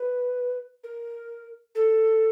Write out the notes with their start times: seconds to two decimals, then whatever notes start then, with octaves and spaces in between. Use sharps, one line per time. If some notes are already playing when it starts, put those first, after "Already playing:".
Already playing: B4
0.84 A#4
1.75 A4